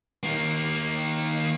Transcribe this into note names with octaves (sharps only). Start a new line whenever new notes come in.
D#3 A#3